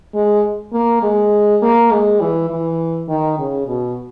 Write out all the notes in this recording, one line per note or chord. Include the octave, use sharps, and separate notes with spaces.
G#3
A#3
G#3
A#3
G#3
E3
E3
D#3
C#3
B2